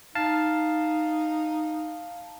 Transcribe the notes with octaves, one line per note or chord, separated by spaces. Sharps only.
D#4 F5 A5